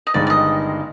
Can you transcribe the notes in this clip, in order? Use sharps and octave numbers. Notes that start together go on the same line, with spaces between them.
D#5
G1 G2 D#3 G#3 D#4 D5
D5
D#5